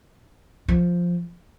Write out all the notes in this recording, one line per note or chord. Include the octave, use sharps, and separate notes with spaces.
F3